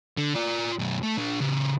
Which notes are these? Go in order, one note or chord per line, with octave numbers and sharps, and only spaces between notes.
D3
F4 D5
B1 F#2
A3
A#2 D4
C#3 G4